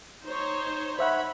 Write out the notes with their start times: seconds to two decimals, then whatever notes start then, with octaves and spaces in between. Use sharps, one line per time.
0.23 D#4 C5 C#5
0.99 C5 C#5 E5 F#5 B5